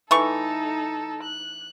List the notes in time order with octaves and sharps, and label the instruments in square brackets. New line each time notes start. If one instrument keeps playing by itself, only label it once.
[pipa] E3 A3 C#6 [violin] D#4 A4
[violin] F#6